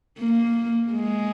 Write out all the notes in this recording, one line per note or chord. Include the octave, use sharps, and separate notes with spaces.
A#3
G#3